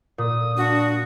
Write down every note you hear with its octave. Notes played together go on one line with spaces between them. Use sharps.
A#2 D#6
D4 F#4